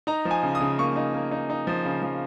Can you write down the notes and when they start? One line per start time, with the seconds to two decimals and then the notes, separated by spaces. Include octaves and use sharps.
0.07 D#4 A#5
0.25 F3
0.31 G#5
0.43 C#3
0.55 D#6
0.60 C#3
0.78 A#3 C#6
0.96 D#4
1.14 A#3
1.31 D#4
1.50 D#4
1.67 F3
1.85 C#3
2.02 F3